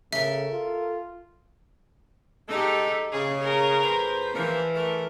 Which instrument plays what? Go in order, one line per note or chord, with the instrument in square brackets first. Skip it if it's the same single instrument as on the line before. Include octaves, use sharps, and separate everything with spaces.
[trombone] C#3 [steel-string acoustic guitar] A4 A#4 [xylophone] E5
[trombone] F4
[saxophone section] G#3 A4 [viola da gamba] D#4 G4
[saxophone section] C#3 [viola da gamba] G#4
[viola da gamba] G#4 A#4
[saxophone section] F2 B4 C5
[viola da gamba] E3 [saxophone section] F3 A#3 A#4
[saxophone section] A3 A#4